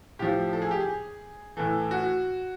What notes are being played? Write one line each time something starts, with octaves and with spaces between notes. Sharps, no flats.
A2 F3 G4
A4
G#4
G4
G#4
A2 E3 A4
F#4